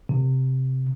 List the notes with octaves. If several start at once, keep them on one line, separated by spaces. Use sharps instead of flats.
C3